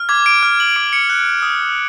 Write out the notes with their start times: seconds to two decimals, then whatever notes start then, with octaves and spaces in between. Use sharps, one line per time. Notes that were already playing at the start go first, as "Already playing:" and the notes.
Already playing: F6
0.09 D6 G#6
0.26 D7
0.43 F6
0.60 F#7
0.76 D6 D7
0.93 C#7
1.10 F#6
1.42 D#6